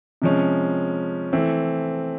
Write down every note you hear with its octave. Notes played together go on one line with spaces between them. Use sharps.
C3 F3 G#3 C#4
E3 A3 C4